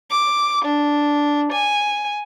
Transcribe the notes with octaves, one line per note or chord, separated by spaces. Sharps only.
D6
D4
G#5